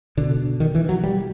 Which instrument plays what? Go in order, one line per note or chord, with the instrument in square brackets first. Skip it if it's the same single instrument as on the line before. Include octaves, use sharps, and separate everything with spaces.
[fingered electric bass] B2 D3
D#3
E3
F#3
G3